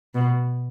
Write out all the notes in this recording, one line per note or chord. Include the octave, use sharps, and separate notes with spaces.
B2